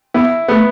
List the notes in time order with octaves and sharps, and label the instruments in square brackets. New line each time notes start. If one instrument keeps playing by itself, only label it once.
[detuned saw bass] B3 [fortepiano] E4
[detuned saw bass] A3 [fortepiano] B3